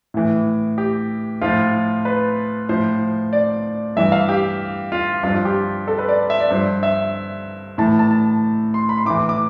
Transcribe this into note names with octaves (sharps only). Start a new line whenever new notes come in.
A2 E3
G4
A2 F3 F4
B4
A2 F3 C5
D5
G2 E3 E5
F5
G4
F4
G2 F3 F4
F4
G4
A4
B4
D5
E5
D5
G2 F3 C5
E5
A2 E3 A5
A5
A5
C6
B5
C6
A2 E3 D6
D6